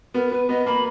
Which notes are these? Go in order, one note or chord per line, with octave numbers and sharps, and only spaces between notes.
B3 A#4
A#4
B3 B4
B3 D#5
A#3 B5